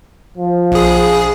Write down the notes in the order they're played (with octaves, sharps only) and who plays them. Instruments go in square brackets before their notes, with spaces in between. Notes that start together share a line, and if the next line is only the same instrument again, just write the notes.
[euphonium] F3
[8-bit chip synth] A#1 G#4